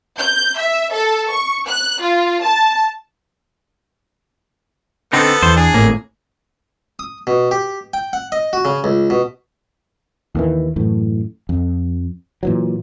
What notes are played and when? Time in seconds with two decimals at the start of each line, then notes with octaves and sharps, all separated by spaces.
0.19 G6
0.58 E5
0.93 A4
1.32 C#6
1.67 F#6
2.02 F4
2.43 A5
5.13 D3 B3 C4 D#4 A4
5.43 E2 C5
5.56 D4 G#4
5.74 G#1 A2 A#3
6.99 D#6
7.27 B2
7.51 G4
7.94 G5
8.13 F#5
8.32 D#5
8.53 F#4
8.65 C#3
8.84 C#2
9.10 B2
10.35 D#2 D#3 E3
10.76 F#2 A2 E3
11.49 F2
12.43 A#2 E3 F#3